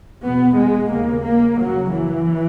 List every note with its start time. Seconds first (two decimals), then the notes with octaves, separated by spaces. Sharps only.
0.23 E2 B2 B3
0.57 G#3
0.91 D#2 C#3 A#3
1.25 A#3
1.59 F#2 C#3 F#3
1.93 E3